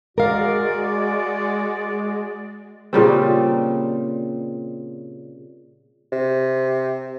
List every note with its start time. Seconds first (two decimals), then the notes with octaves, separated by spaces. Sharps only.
0.18 G#3 F#4 A#4 D5 F5
2.93 A#2 C#3 G3 C4
6.12 C3